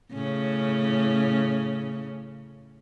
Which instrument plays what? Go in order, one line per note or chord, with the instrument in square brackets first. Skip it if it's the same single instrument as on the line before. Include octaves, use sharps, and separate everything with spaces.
[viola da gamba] A2 C#3 C#4